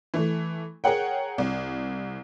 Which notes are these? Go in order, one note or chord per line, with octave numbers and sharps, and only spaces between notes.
E3 A3
G#4 A#4 C#5 F#5 G5
C2